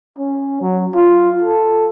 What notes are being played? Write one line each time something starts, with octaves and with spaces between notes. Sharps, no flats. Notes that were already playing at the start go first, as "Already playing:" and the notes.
C#4
F#3
F4
A4